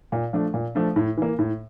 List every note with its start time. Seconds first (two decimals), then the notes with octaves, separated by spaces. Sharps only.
0.12 A#2
0.33 F3 A3 D4
0.54 A#2
0.75 F3 A3 D4
0.96 A2
1.17 E3 A#3
1.39 A2